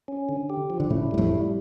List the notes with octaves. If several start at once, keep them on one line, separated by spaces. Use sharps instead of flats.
C#4
D3
G4
F3
D3
A2 C#3 E4
G2 G3
F2 A2
G3